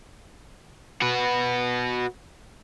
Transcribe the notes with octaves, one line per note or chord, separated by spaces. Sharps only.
F#4 B4